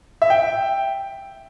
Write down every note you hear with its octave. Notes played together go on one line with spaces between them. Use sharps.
E5
G5